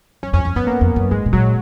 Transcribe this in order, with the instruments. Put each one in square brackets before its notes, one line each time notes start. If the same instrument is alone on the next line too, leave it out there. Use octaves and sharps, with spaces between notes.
[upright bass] F#2 [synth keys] C#4
[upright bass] F2 [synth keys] C#4
[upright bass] F2 [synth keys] C#4
[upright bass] F#2 [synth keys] B3
[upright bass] F2 [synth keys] A#3
[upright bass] F2
F#2
[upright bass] G#2 [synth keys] G#3
[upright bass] B2
[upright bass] A#2 [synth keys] F#3